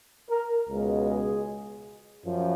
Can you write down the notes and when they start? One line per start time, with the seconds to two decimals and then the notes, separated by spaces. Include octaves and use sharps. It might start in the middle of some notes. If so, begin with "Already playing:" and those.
0.30 A#4
0.69 C#2 B2 G#3
1.08 G#4
2.26 F#2 F3